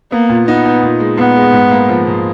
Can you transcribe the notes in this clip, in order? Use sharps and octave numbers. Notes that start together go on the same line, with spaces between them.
A#3 B3
A#2
B3 D#4
D#4
A#2
G#3
A#2 B3
G#3
G#2
A#3
F3
G#2